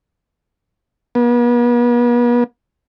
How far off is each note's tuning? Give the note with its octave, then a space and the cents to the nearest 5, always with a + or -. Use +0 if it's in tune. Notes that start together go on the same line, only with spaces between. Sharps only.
B3 -40